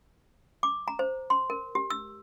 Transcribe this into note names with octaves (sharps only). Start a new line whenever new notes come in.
D6
A#5
C5
C6
A#4
G4
E6